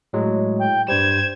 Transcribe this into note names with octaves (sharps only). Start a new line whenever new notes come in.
A2 F#3 G#3
G5
G2 G3 C5 G#6 E7